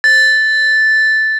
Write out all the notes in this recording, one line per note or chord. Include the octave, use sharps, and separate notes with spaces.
A6